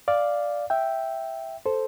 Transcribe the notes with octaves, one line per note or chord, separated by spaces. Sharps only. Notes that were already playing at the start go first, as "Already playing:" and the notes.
D5 F5
E5 G5
A4 C5